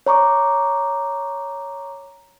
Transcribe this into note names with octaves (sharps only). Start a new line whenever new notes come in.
C#5 A#5 C#6 D6